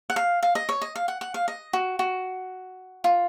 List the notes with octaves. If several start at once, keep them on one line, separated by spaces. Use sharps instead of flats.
F#5
F5
F5
D#5
C#5
D#5
F5
F#5
F#5
F5
D#5
F#4
F#4
F4